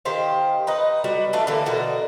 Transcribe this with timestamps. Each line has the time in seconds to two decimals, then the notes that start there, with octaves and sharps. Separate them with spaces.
0.05 D#3 G4 C5 F5
0.67 D#4 B4 D#5
1.04 G3 B3 F#4
1.33 E3 A3 D4 F5
1.47 D3 E3 A#3
1.66 B2 D3 F#4 A#4